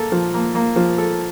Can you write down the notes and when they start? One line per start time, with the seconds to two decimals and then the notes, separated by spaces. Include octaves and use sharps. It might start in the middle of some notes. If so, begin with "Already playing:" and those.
Already playing: A#3 A4
0.12 F3
0.34 A#3
0.55 A#3
0.76 F3
0.98 A4